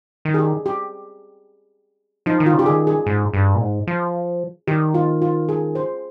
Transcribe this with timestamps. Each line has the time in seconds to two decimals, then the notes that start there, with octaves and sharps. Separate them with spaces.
0.25 D#3
0.34 G#4
0.39 G4
0.66 G4
2.26 F3 D#4
2.40 D#3
2.46 F4
2.54 C#3
2.59 G4
2.66 D#3 G#4
2.87 G#4
3.06 G#2
3.34 G2
3.55 A#2
3.61 G#2
3.87 F3
4.67 D#3 G4
4.94 F4
5.22 F4
5.49 G#4
5.75 C5